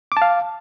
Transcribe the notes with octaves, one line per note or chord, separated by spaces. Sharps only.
F5 A5 D6